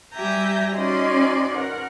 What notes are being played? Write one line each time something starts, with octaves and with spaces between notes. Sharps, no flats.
G3 G4 E5 G#5 A#5 G6
C#4 D#4 F#4 D5 D#5 C6
A#4 F#5